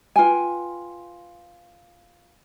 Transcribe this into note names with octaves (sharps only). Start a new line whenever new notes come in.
F4 B4 G5 G#5